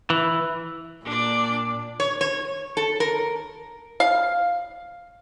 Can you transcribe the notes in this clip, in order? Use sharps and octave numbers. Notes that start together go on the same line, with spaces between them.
E3
A#2 D4 D5
C#5
C#5
A4
A#4
F5